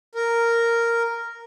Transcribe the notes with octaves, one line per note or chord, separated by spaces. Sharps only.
A#4